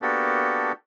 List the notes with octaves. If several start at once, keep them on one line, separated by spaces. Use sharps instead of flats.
A#3 B3 D4 F#4 G4 A4